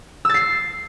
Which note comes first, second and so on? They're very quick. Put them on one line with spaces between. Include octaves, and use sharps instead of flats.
E6 A6 C7